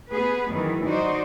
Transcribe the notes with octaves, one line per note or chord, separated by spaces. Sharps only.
B3 G#4 B4
F#2 D#3 E3
D#4 F#4 C5 D5